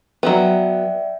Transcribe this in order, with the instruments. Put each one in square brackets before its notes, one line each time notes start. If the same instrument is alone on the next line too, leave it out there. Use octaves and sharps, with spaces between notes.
[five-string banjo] F#3 B3 [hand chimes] D5 E5 G5